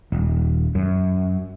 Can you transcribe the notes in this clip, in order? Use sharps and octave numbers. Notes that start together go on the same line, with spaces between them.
D#1
F#2